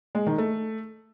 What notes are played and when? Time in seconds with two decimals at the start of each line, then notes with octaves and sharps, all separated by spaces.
0.15 G#3
0.27 D#3
0.38 A3